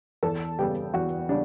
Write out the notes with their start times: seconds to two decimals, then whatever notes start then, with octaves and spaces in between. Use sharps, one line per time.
0.23 E2 A4 A5
0.59 C#3 G3 B3 G4 G5
0.93 E2 F#4 F#5
1.29 C#3 G3 D4 D5